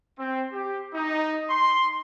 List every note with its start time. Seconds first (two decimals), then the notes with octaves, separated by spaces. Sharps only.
0.17 C4
0.52 G4
0.94 D#4
1.49 C6